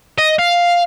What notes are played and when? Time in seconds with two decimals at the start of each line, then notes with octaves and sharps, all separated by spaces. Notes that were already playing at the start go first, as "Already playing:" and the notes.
0.18 D#5
0.39 F5